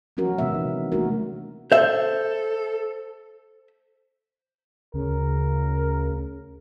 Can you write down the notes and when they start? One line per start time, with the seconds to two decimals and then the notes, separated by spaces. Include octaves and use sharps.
0.17 F3 F#3 C#4 F#4 A#4
0.39 C3 E3 G#3 B3 E5
0.55 D#4
0.92 A3 A#3 D4 D#4 F#4 A#4
1.72 A4 C5 E5
4.94 D2 C#3 A#4